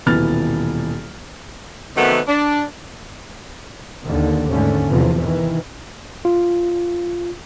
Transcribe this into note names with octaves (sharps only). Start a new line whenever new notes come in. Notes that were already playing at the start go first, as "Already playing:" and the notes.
D#1 B2 E3 B4 F6 A6
F#2 C3 D#3 A3 B3 F#4
D4
D#2 D3 D#3
D#2 G#2 D3 A3 C#4
E2 C3 E3 F3
D#3 E3
F4